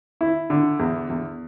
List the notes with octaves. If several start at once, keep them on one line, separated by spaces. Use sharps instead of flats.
E4
D3
E2
E2